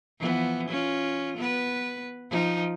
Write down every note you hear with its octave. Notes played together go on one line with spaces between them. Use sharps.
E3 F3 B3
C#4 F4
B3 B4
F3 D#4